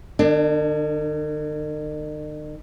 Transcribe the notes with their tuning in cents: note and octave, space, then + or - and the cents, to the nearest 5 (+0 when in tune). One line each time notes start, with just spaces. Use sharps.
D#3 -45 D4 +10